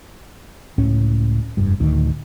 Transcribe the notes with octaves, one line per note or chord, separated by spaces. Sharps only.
C#2 A2 C#4
F1 G2
D1 D2 D#3